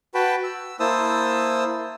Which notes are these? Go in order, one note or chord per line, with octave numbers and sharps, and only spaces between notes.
F#4 B4 G5 A5 B5
E6
A#3 E4 C5 A5 D#6 E6